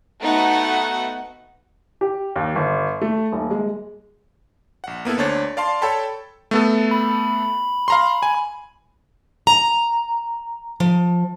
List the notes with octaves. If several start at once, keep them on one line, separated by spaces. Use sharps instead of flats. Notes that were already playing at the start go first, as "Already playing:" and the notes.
A3 B3 D#4 F#4 F#5
G4
D#2
G1
A3
D#1
G#3
A#1 F#5
A#3 B3 E4 A4
D2 D4 C5 C#5 A6
D5 F5 A5 C6
A4 C#5 G5 A5 B5
A3 B3 A4
B5
F5 A#5 C6
G#5
A#5
F3